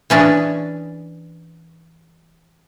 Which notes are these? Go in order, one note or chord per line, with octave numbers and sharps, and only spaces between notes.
E3 C#4 D4 G#4